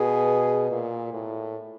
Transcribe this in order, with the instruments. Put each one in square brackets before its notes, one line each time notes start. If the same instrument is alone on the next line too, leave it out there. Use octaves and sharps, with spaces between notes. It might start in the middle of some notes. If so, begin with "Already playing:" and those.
Already playing: [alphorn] B2 [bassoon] G#4
[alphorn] A#2
A2